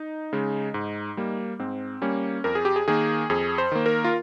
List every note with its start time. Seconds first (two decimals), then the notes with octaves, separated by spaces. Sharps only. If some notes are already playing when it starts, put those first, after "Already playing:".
Already playing: D#4
0.33 C#3 G#3
0.74 G#2
1.17 G3 A#3
1.59 G#2 C4
2.02 G3 A#3 C#4
2.44 F2 A#4
2.55 G#4
2.65 G4
2.76 G#4
2.88 D#3 A#3 G#4
3.30 F2 G#4
3.58 C5
3.72 D#3 A#3
3.86 A#4
4.04 F4